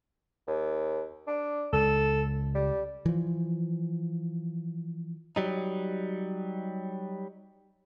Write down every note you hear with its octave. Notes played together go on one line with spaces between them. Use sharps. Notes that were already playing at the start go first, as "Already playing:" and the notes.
D#2
D4
C#2 A4
G3
E3 F3
F#3 G3 D#4